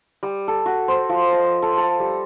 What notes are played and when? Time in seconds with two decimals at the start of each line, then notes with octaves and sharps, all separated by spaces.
0.23 G3
0.48 A4
0.66 F#4
0.88 C5
1.09 F3
1.33 D#5
1.62 A4
1.78 A4
2.00 G3